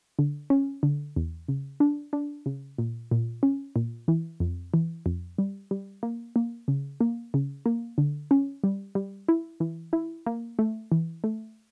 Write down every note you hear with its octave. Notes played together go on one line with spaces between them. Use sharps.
D3
C#4
D3
E2
C#3
D4
D4
C#3
A#2
A#2
C#4
A#2
E3
F2
E3
F2
G3
G3
A#3
A#3
C#3
A#3
C#3
A#3
D3
C#4
G3
G3
E4
E3
E4
A#3
A3
E3
A3